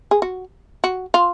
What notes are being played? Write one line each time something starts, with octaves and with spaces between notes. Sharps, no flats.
G#4
F#4
F#4
F4